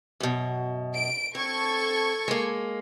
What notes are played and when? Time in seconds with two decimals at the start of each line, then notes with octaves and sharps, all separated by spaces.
0.20 F#2 B2
0.95 D7
1.35 C4 A4 C#6 G#6
2.28 G#3 A#3